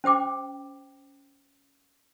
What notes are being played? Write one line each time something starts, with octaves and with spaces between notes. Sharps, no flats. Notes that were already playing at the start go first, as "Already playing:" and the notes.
C#4 C5 G5 D6